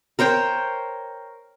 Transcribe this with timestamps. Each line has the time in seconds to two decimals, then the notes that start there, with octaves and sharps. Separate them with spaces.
0.19 A#4 C5 C#5 G5